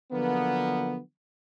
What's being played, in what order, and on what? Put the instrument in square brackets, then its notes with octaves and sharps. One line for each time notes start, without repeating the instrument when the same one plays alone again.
[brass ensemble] D3 F3 F#3 A#3 B3